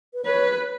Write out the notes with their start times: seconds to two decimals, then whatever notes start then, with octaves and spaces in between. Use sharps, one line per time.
0.14 B4
0.25 B4 C#5